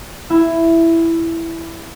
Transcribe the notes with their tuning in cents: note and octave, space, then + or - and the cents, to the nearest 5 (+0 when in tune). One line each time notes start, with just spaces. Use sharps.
E4 +5